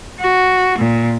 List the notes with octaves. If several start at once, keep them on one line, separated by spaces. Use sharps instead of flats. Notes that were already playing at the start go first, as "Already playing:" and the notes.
F#4
A#2